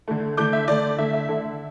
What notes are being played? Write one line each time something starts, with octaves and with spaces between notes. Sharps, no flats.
D3 A3
D3 A3 D6 G6
E5
D3 A3 D5
D3 A3 E5
E5
D3 A3